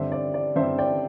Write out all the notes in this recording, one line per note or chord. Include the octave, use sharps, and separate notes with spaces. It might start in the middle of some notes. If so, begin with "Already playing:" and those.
Already playing: G2 D3 C4 C5 E5
D5
D5
G2 D3 C4 C5 E5
D5 G5